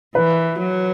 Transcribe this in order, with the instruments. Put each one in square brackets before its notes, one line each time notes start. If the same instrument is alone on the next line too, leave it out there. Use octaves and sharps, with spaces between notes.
[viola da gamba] E3 [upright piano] B4
[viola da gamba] F#3